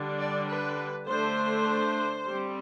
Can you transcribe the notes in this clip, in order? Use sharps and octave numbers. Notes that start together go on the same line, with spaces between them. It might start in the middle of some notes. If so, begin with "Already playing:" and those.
Already playing: D3 G3 D4
D5
B4
D3 A3 D4 C5
G3 C4